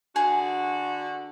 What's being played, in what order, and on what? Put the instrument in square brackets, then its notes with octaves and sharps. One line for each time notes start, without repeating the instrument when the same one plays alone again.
[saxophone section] D3 F#4 [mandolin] G#4